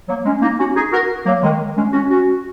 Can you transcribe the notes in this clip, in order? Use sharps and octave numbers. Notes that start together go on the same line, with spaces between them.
F#3 A#3
G#3 C#4
A#3 D#4
C#4 F#4
D#4 G#4
F#4 A#4
F#3 A#3
D#3 G#3
G#3 C#4
C#4 F#4
C#4 F#4